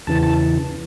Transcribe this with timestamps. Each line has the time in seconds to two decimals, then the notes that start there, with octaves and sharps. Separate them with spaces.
0.07 E2 C#3 E3 A5
0.23 A5